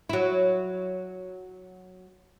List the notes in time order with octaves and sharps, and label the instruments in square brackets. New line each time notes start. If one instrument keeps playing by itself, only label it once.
[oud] F#3 E4